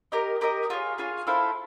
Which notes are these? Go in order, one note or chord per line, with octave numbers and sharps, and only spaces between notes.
G4 A#4 D#5
G4 A#4 D#5
F4 G#4 C#5
F4 G#4 C#5
E4 A4 C5 F5